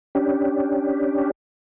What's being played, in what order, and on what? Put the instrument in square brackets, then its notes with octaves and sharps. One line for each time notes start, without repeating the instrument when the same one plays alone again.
[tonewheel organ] C#4 D4 G4